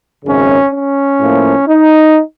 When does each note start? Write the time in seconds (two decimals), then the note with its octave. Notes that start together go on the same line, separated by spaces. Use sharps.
0.23 G#1 F#2 C#3 C#4
0.72 C#4
1.20 A2 F3 A#3
1.68 D#4